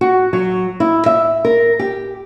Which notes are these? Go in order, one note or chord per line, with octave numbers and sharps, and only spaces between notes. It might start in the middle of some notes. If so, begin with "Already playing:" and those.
F#4
F#3
E4
E5
A#4
G4